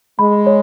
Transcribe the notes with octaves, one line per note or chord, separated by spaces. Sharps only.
G#3 B5
C#5